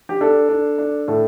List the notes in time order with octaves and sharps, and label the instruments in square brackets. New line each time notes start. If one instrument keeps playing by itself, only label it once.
[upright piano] G4
[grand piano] D4 [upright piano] A4
[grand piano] D4
D4
[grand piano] A2 [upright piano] A4